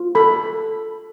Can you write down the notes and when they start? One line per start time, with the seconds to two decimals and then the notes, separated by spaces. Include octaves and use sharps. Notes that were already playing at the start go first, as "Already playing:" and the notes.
Already playing: F4
0.15 A4 B5